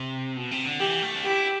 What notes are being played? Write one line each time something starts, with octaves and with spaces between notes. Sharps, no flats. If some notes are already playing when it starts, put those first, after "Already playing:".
Already playing: C3
B2
C3
D3
E3 G4
A3
D4
E4 G4